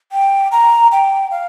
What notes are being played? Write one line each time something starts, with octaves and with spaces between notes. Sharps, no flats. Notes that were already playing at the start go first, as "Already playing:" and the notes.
G5
A#5
G5
F5